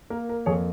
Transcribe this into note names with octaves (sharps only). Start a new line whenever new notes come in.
A#3 A#4
A#4
F2 G#4 C#5